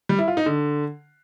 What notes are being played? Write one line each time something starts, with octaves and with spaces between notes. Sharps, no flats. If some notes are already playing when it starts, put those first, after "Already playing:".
G3
E4
F4
D#4
D3